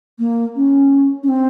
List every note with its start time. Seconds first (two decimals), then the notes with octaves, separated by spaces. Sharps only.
0.19 A#3
0.56 C#4
1.23 C#4
1.28 C4